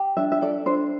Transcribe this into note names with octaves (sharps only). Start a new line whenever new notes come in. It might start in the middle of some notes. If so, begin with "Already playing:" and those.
Already playing: G4
D4 E5
E5
A4 D5
D4 C5